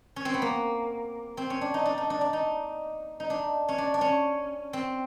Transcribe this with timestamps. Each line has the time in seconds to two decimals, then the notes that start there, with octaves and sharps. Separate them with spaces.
0.16 C#4
0.25 C4
0.34 B3
0.42 A#3
1.37 C4
1.50 C#4
1.61 D4
1.74 D#4
1.85 D4
1.98 D#4
2.10 D4
2.21 D4
2.33 D#4
3.20 D#4
3.30 D4
3.69 C#4
3.78 D4
3.94 D4
4.01 C#4
4.73 C4